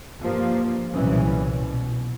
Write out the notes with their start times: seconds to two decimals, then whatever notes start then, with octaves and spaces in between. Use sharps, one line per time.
0.21 G2 F3 A#3
0.92 C2 A#2 E3 F#3 C#4
1.54 B2